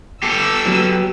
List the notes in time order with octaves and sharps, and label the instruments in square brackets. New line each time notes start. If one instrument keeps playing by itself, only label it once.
[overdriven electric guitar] G4 A4 [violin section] E6
[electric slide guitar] F#3 B3